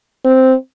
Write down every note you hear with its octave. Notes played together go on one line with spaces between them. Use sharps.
C4